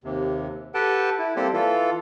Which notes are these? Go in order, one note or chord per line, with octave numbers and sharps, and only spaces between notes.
D#2 C3
G4 A4 B4 F#5 G5 A5
E4
G3 A#3 C4 G4 A4 C5
E3 F4 A4